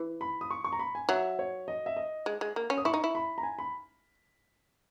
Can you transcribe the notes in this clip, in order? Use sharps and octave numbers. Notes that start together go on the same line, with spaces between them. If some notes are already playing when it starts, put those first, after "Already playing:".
Already playing: E3
B5
D#6
C#6
C#6
A#5
B5
G#5
F#3 E5
C#5
D#5
E5
D#5
G#3
G#3
A#3
C#4
D#6
E4 C#6
D#4
E4
B5
A#5
G#5
B5